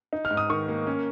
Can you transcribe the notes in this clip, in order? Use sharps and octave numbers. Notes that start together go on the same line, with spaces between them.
D#4
F6
G#2
D#6
D#3 C#6
A#3
C#4